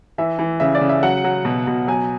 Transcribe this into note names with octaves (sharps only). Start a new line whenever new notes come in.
E3 E5
E3
C#3 E5
D5
C#3
E5
F#3 F#5
F#3
B2
B2
F#3 G#5